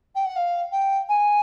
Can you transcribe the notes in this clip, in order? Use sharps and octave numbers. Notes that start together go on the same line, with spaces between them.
G5
F#5
F5
G5
G#5